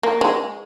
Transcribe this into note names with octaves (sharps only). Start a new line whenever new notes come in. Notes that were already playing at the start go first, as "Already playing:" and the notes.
A#3
G#3